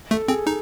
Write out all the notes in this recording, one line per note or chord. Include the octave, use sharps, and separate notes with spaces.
A3 A4
C4 G#4
D#4 A4